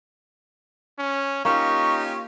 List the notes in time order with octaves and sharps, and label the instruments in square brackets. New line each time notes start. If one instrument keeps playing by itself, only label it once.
[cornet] C#4
[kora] A#3 [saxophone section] C#4 F4 G4 [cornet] D#4 [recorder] C#6